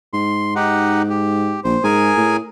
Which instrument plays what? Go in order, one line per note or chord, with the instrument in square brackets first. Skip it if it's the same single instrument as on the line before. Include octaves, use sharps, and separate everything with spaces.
[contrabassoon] G#2 [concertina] C6
[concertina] D#4 G4 F#5
G4
[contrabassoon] A#1 [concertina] C5
[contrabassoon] G#2 [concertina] G#4 A#4 G#5
[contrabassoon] A2